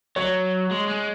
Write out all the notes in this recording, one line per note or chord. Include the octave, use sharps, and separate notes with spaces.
F#3 C#5
G#3
G#3